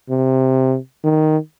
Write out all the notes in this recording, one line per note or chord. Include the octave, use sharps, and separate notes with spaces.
C3
D#3